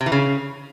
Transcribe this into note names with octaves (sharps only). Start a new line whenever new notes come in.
C3
E3
C#3